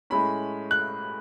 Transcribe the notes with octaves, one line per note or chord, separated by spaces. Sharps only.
A2 G#3 C#4 B5
F#6